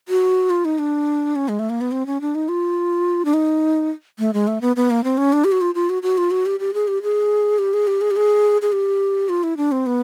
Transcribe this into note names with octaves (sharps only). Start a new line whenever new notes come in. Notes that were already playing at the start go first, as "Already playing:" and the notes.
F#4
F4
D#4
D4
C#4
G#3
A3
A#3
B3
C4
C#4
D4
D#4
F4
D4
D#4
A3
G#3
A3
B3
B3
A#3
C4
C#4
D4
G4
F#4
F4
F4
F#4
F#4
F4
F#4
G4
G4
G#4
G4
G#4
G4
G#4
G4
G#4
G4
G#4
G#4
G4
F4
E4
D4
C4
B3